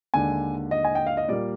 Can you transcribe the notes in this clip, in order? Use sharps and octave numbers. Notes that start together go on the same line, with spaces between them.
D#2 D3 G#3 G#5
D#5
G#5
G5
F5
D#5
A#2 G3 A#3 D5